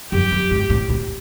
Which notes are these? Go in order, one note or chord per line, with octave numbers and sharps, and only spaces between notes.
F#2 G4
F#2
G#2
A2
A2